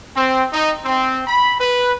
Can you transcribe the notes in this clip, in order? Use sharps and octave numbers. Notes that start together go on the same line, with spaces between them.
C4
D#4
C4
B5
B4